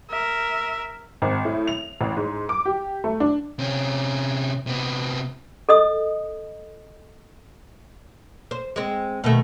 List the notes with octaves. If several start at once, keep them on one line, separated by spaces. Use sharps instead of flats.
A#4 E5
G#1
A2
F7
A1
G#2
D6
G4
A3
D4
C3 C#4
C3 B3
A4 D#5 D#6
C5
G#3 C4
B2 D#3 A3